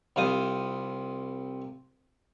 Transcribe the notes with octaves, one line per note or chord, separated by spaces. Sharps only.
C2 C3 F4 C5 D#6